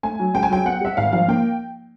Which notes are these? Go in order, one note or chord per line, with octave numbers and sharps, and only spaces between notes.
A3 G#5
F#3
C#2 G5
G#5
F#3 G5
B3 F#5
G3 E5
G#1 F5
F3 F5
A#3 G5